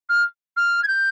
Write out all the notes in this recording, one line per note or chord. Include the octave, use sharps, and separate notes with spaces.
F6
F6
G#6
G6